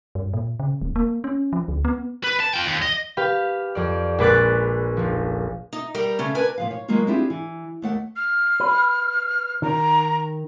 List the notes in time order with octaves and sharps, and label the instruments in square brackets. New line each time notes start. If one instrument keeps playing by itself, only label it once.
[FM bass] G2
A#2
C#3
D#1
A#3
C#4
F3
D2
B3
[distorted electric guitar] B4
A5
F4 G5
D#2
D#5
[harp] G4 B4 F5
F2 D5
A#1 G#3 B4 D6 F#6 A6
F1 F3
[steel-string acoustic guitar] D#4
G3 A#4 G5
C#3 A3 C#4
D4 A#4 B4 G#5
[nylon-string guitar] A#2 F3 F5
C#5
D#3 F#3 G#3 A#3 B3 F4
C4 D4 E4 F4 G4 G#4
E3
D#2 A3 F#5
[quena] F6
[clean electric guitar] B4
[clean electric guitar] D#3 [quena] A#5